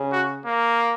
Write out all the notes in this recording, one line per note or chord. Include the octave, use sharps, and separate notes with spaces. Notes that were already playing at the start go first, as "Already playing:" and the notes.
Already playing: C#3
F#4
A#3